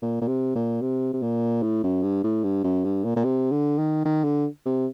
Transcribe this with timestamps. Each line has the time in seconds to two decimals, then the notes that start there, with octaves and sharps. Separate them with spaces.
0.02 A#2
0.21 A#2
0.28 C3
0.56 A#2
0.82 C3
1.13 C3
1.22 A#2
1.63 A2
1.84 F#2
2.03 G2
2.24 A2
2.44 G2
2.64 F#2
2.84 G2
3.05 A#2
3.16 A#2
3.24 C3
3.51 D3
3.78 D#3
4.05 D#3
4.24 D3
4.66 C3